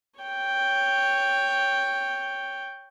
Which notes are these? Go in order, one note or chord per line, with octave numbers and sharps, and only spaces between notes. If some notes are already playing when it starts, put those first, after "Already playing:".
C#5 G5